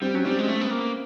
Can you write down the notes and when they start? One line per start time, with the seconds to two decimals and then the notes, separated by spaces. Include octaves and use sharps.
0.01 G3 C4
0.14 F#3 C#4
0.25 G3 C4
0.39 G#3
0.48 A3
0.61 B3
0.71 A#3